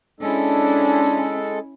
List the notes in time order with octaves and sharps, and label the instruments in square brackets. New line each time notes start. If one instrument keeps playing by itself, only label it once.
[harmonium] G#3 A4 [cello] C#4 E4 [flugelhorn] D4